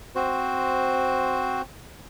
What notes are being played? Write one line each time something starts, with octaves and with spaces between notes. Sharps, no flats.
C4 F#4 C5